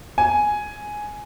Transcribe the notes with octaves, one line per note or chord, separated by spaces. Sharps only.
G#5